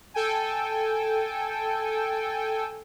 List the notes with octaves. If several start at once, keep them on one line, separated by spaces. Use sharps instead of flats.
A4 G5 G#5